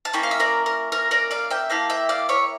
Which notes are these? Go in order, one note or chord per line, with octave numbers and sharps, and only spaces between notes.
A5
A#3 C#4 E4 G5
F5
E5
A#4 D5
A#4
A#4
A#4 D5
D5 F5
E5 G5
A#3 E4 G4 F5 A5
E5 G5
D5 F5
C#5 E5